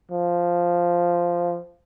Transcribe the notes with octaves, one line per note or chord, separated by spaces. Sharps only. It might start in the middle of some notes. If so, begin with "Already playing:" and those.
F3